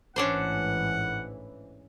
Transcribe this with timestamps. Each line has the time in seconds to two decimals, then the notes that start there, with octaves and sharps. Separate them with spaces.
0.16 A1 G#2 E3 C#4 D4 C5 F#5